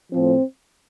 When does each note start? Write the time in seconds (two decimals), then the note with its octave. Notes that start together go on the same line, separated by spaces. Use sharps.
0.11 A2 F3 C4